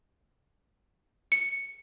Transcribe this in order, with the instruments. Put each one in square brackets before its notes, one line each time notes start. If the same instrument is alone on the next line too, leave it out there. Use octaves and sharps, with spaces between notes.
[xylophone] C#7